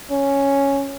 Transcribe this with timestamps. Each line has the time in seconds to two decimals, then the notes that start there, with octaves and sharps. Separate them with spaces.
0.11 C#4